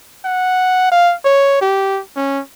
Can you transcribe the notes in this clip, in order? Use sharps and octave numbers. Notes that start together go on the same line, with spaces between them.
F#5
F5
C#5
G4
C#4